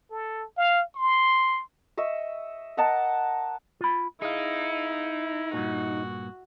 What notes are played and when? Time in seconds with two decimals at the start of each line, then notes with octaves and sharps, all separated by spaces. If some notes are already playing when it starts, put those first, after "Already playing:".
0.10 A4
0.57 F5
0.96 C6
1.97 D#5 E5 C#6
2.77 A#4 D#5 F#5 A5
3.81 F4 B5
4.22 D#4 E4 G#4 F5
5.54 G2 A#2 F#4